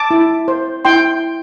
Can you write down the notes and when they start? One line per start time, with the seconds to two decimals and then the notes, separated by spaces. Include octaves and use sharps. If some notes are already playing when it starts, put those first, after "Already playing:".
Already playing: A5 D6
0.11 E4
0.48 C5
0.85 E4 G5 C6